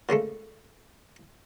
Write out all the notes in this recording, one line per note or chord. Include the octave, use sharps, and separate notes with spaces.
A#2 C#3 G#3 A3